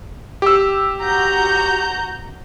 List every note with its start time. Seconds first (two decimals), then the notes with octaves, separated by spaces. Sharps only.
0.42 G4 E6
1.01 F#4 A#5 G6